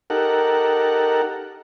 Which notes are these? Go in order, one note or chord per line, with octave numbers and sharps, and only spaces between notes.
D#4 G4 A4 A#4 F#5